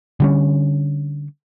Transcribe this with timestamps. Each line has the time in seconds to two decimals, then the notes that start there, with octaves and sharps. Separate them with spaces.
0.20 D3 G3 C#4